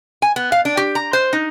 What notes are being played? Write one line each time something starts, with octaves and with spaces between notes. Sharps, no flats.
G#5
B3
F5
D4
G4
A#5
C5
D#4